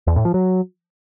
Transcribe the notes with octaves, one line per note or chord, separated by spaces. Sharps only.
E2
A2
F3
F#3